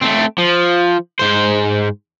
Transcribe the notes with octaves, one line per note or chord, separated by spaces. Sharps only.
A3 C4
F3
G#2 C5